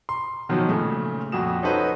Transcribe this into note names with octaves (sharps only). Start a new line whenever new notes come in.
C6
B2 D#3 F3 F#3
A#2 C#3 A3
F2 A#2 F#4 D#6 E7
C#4 D#4 F#4 A4 B4 C5